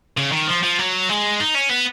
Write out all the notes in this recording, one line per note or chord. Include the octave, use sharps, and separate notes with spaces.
C#3
D#3
F3
F3
F#3
G#3
D#4
C#4
B3